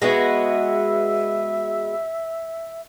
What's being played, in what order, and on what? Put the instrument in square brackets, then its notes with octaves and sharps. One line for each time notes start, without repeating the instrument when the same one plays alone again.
[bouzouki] G#3 B3 F#4 [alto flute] E5